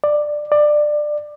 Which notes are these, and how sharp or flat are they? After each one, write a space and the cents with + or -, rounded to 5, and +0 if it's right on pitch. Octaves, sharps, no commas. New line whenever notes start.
D5 +15
D5 +20